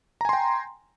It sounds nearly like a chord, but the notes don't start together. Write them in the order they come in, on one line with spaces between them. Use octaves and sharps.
A#5 G#5 C6 G5